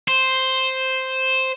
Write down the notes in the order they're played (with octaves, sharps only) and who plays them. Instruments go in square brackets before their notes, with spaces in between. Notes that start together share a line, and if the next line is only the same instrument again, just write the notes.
[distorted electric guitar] C5